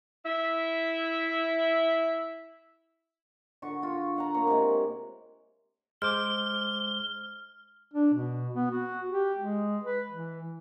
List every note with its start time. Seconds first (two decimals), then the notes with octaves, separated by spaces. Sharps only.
0.26 E4 E5
3.62 D3 F#4 C#6
3.82 F4 F#4
4.16 F5 F#5 A#5
4.34 A#3 C#5
4.47 C3 G#3
6.02 G#3 C5 D6 F6 G7
7.94 D4
8.14 B2
8.54 B3
8.71 F#4
9.10 G4
9.38 G#3
9.84 B4
10.12 E3